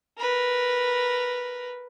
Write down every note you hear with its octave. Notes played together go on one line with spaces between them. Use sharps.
A#4 B4